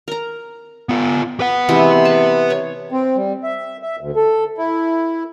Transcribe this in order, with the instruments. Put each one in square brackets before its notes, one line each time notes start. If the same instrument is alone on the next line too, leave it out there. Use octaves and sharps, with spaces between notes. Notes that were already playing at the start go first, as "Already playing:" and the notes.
[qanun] A#4 A#5
[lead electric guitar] B3 F4
B4 F#5
[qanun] C3 E3 G#3
A5
C#5
[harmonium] C4
G3
E5
E5
D2
A4
E4